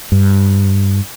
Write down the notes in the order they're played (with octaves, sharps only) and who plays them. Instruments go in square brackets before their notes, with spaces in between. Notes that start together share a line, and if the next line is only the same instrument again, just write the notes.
[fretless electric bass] G2